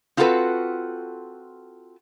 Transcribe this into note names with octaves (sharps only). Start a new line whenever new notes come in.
C4 F4 F#4 G#4 A4 B4